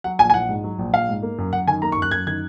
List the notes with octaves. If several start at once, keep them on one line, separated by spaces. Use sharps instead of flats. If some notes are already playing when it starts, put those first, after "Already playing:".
F#3 F#5
A#1 G#5
G#5
A#1 F#5
G#2
F#3
A#1
A#1 F5
G#2
A#3
F#2
F#2 F#5
D#3 G#5
A#3 A#5
C#6
F#2
F#6
F#2 G#6
D#3 G#6